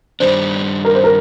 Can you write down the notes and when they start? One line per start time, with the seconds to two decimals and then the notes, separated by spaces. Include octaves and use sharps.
0.20 G2 D#3 G3 D4 C5
0.85 A#4
0.95 C5
1.04 A#4